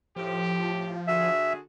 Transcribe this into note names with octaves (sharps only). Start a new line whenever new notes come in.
A2 F3 G4
D3 F#4 G#4 E5